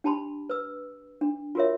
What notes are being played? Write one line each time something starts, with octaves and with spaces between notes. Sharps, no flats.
D4 G4 A5 B5 C6
B4 E6
D4
F4 F#4 A#4 C#5 E5